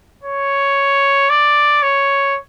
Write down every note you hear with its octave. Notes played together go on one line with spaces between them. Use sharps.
C#5
D5
C#5